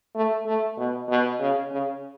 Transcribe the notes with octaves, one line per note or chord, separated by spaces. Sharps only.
A3
A3
B2
B2
C#3
C#3